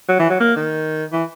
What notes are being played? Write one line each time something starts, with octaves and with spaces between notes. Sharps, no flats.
F#3
E3
F#3
A#3
D#3
E3